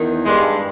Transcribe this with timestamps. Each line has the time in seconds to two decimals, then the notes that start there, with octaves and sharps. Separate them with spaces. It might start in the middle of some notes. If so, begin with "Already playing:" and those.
Already playing: E2 D#3
0.26 G2 G#3